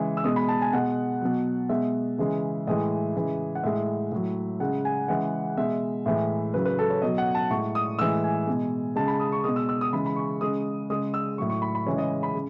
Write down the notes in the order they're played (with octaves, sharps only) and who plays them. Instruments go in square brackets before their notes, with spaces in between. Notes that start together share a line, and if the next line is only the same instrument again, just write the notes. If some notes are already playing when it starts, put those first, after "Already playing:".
Already playing: [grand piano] C#3 E3 G#3
E6
B2 G#3 D#6
B5
A5
G#5
B2 G#3 F#5
B2 F#3
B2 G#3 E5
C#3 E3 G#3
A2 E3 G#3 D#5
C#3 E3 G#3
F#5
A2 G#3 E5
A2 F#3
C#3 G#3 F#5
G#5
C#3 E3 G#3 F#5
B2 G#3 E5
A2 E3 G#3
C#3 F#3 B4
B4
A4
C#5
B2 F#3 D#5
F#5
A5
A2 G#3 C#6
D#6
A2 E3 G#3 E6
G#5
B2 G#3
C#3 G#3 A5
B5
D#6
C#6
B2 G#3 D#6
E6
E6
D#6
C#3 E3 G#3 B5
B5
C#6
C#3 G#3 D#6
C#3 G#3 D#6
E6
A2 F#3 C#6
C#6
B5
B5
C#3 E3 G#3 C#5
D#5
B5
C#3